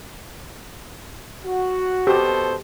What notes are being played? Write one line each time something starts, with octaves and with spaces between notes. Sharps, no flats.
F#4
B2 G4 A4 C5